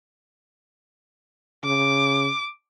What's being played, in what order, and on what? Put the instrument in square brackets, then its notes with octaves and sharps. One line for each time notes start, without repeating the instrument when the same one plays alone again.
[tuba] C#3 [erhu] D6